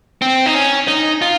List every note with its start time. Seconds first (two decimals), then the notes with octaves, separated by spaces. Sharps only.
0.22 C4
0.46 D#4
0.55 C#4
0.88 D#4
1.22 F4